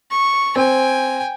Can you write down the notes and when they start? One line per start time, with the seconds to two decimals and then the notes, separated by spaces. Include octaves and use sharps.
0.11 C#6
0.56 C4 G5 G#5